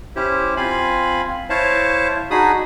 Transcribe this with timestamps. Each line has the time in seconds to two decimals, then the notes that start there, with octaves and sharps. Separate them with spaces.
0.16 C#4 E4 G4 C5
0.57 C4 F4 F5 G#5 B5
1.50 E4 C5 C#5 F5 A5
2.31 D4 D#4 F#4 G#4 B5 D#6